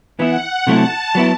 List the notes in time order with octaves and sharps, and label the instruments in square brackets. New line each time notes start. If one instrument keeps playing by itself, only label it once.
[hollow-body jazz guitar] E3 B3 E4 [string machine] F#5
[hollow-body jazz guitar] C3 F#3 A3 E4 [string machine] A5
[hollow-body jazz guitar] F#3 B3 E4